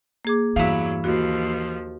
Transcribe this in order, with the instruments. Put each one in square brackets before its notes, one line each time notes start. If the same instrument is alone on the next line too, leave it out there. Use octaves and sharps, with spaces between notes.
[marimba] A#3 G#4 D6
[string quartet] E2 G2 F#3 [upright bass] E3 [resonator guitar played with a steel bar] E4 F5
[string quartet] D#2 F3 [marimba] F#4